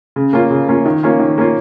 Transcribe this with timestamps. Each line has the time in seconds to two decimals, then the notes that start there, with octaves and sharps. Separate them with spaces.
0.16 C#3
0.33 A#3 C#4 F4
0.51 C#3
0.68 A#3 C#4 F4
0.86 D#3
1.03 A#3 C#4 F4
1.19 D#3
1.38 A#3 C#4 F4